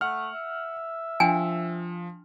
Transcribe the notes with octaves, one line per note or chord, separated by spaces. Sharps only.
A3 F#5 F6
E5
F3 D4 G5 G#5